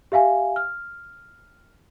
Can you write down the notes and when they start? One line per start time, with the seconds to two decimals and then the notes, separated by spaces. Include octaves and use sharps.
0.12 G4 E5 F5 G#5
0.56 F6